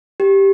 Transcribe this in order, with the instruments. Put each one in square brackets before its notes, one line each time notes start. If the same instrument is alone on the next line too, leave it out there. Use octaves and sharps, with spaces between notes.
[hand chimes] G4